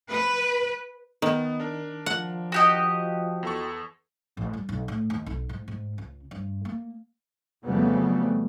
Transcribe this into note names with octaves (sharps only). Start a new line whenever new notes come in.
B4
D#3 B3
D4 A#4
F3 F#5
F#4 G4 D#5
E2 A4 C#6
A1
G3
B1
A2
D#2
B1
G#2
G#2
C#2
G2
A#3
F2 C#3 F#3 G3 A3 B3